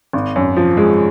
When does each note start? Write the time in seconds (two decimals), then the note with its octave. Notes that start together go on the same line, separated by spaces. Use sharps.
0.13 G#1
0.36 F#2
0.57 F3
0.77 G#3